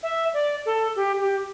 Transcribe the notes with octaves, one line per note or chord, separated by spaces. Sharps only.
E5
D5
A4
G4
G4